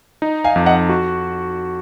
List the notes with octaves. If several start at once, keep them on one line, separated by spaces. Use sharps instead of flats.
D#4
F5 G#5
F2
D#5 F#5
F#4